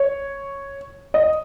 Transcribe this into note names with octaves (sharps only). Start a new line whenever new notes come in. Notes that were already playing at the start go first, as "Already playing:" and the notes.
Already playing: C#5
D#5